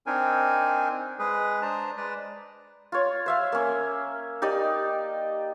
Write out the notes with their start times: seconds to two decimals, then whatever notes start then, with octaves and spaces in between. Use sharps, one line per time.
0.07 C4 D4 D#4 A#4 G#5
1.19 G#3 G#4 B4
1.62 D4 C5 A5 A#5
1.97 G#3 B4 D5
2.92 F4 C#5
3.26 C5 E5 F5
3.52 A#3 C#4
4.42 D#4 G4 D5 D#5